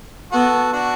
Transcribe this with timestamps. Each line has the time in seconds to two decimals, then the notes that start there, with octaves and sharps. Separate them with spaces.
0.32 B3 F#4 A4
0.73 D4 F#4